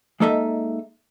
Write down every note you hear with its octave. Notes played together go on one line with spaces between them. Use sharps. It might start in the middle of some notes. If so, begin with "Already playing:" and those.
G#3 A#3 D#4 A4 D#5 E5